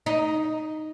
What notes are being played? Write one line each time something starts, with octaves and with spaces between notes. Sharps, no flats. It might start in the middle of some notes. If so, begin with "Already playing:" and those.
D#4